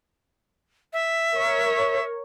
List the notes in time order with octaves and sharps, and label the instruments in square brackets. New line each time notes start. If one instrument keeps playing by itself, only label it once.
[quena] E5
[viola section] A#4 C#5